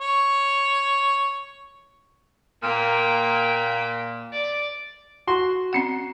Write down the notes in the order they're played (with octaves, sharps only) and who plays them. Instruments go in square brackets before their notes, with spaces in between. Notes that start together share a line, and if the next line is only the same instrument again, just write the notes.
[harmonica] C#5
[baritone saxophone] A#2 [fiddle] A#3 G5
[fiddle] D5
[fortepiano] F#4 C6
[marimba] C4 C#4 F#5